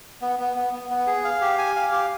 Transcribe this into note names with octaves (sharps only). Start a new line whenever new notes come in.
B3
B3
B3
B3
B3
G#4
F5
G4
G#5
F5
G4